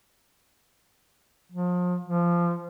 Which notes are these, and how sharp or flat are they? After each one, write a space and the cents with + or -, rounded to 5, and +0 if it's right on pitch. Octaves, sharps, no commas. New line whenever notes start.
F3 +35
F3 -15